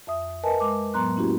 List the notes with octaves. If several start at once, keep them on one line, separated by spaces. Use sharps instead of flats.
F2 E5 D#6
A#4 B4 D#5 G#5 A5
G#3 D6
A2 F#3 B3 A#5 C6 F#6
A#3 C#4 E4 F#4 G4